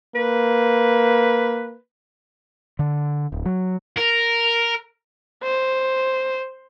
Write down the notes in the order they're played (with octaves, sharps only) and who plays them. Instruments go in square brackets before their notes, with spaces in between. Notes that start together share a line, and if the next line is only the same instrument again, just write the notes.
[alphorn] A#3 [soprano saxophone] B4
[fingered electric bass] D3
D1
F#3
[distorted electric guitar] A#4
[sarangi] C5